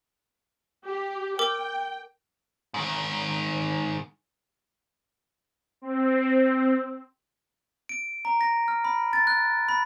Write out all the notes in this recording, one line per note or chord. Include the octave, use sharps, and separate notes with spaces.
G4
A#4 G5 D6
G#2 D#3
C4
D7
A#5
A#6
F6
B5
A6
F#6
B5